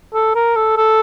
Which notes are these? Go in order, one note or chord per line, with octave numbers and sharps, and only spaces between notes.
A4
A#4
A4
A4